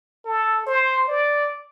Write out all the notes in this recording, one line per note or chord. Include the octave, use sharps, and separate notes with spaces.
A4
C5
D5